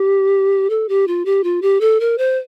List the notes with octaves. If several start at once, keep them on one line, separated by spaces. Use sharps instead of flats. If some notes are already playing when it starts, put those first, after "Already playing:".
Already playing: G4
A4
G4
F4
G4
F4
G4
A4
A#4
C5